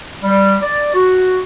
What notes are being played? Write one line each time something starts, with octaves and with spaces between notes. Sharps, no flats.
G3
D5
F#4